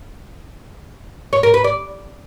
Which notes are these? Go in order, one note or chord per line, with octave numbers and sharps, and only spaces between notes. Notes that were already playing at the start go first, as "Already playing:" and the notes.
C#5
A#4
B4
D5